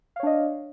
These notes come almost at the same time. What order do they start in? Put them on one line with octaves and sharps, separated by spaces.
F5 C#5 D4 D#5